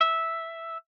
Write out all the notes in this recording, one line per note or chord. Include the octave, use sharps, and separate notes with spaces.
E5